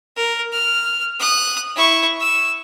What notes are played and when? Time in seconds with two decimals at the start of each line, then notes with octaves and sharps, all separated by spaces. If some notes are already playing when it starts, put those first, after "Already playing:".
0.16 A#4
0.52 F6
1.20 D#6 F#6
1.76 E4 C#6
2.20 E6